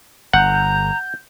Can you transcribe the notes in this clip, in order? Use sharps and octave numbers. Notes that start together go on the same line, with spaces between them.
G1 F#5 A#5 G6